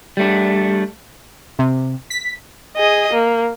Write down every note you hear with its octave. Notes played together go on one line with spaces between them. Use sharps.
G3 A3 D4
C3
B6
G#4 D#5
A#3